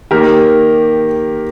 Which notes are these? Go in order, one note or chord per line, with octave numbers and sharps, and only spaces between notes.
D#3 A#3 G4 A#4